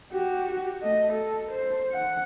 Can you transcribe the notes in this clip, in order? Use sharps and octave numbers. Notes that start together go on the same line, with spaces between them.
F#4 G4
A3 D#5
A4
C5
F#5